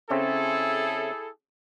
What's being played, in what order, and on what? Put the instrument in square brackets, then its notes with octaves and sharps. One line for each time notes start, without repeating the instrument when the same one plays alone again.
[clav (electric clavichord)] C#3 C4 C#4 [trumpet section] E4 G#4 A4 [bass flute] E5